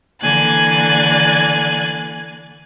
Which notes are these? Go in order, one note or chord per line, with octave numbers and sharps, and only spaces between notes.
D3 E3 A#3 G#5 F#6 A6